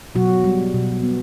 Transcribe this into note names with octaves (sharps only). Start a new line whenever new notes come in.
B2 F#3 F#4
G3
B2
B3